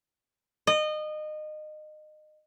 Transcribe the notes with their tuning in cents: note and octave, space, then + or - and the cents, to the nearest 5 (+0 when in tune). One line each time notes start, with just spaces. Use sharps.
D#5 -25